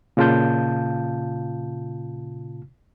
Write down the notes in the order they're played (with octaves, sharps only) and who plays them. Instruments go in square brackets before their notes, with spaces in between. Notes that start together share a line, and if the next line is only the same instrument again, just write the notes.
[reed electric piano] A#2 C#3 F4 F5 A5 G6